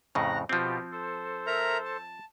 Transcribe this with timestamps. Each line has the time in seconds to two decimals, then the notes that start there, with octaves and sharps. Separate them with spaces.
0.15 F2 A2 C#3 A#5 F#6 A#6
0.49 B2 F3 C4 F4 G4
0.92 A4 C5
1.47 A#4 E5 A#5
1.85 A5